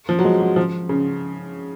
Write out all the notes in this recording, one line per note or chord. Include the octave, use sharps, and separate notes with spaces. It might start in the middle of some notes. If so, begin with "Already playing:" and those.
F3
F#3
G#3
F#3
F3
C#3